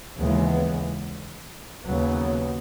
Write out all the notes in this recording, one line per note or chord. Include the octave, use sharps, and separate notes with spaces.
D#2 C#3 E3 G#3 B3
D#2 C#3 F#3 B3